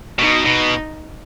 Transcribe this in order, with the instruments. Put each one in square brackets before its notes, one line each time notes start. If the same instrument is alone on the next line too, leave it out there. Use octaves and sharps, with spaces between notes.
[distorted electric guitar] B2 [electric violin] D#4
[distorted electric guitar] B2